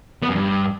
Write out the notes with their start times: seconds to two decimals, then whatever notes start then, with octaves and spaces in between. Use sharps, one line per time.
0.23 B3
0.29 F#2
0.36 G2